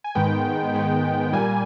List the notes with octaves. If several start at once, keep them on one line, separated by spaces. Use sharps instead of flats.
G#5
G#2 D#3 G#3 B3 G5
G#2 D#3 G#3 B3
A#2 G3 A#3 G#5